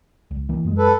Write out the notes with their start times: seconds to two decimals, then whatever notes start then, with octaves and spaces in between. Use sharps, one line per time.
0.31 C#2
0.49 E3 A#3
0.65 F#2 G#3
0.78 A4 B4